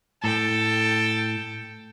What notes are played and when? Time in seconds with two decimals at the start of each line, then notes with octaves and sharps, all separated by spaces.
0.24 A2 A4 G5